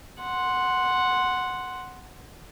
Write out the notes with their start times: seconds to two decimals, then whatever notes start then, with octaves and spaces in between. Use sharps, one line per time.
0.21 F#5 C6